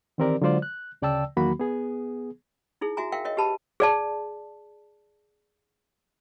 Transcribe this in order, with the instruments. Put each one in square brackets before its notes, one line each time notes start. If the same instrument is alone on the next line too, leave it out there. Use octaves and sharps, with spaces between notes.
[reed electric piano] D#3 E3 C4 G4 A#4 D5
D3 F#3 G#3 F4 C5 D5
F#6
D2 C#3 D5 G5 A5 E6
E2 D#3 F#3 A#3 F#4 B5
B3 G#4
[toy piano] D#4 E4 G#4
F#4 E5 G#5 A#5
A#4 E5 F5 G5
A#4 C#5 D#5 G5
G4 B4 A5 B5
G#4 D5 A5